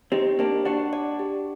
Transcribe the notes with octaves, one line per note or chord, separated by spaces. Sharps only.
C4 D#4 G4
A#3 D4 G4
D4 F#4 F#5
D5
G4